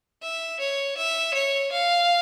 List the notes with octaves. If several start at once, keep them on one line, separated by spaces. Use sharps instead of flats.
E5
C#5
E5
C#5
F5